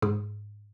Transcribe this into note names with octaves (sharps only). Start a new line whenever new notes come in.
G#2